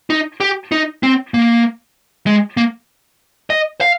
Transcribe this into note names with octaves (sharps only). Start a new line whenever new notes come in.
D#4
G4
D#4
C4
A#3
G#3
A#3
D#5
F5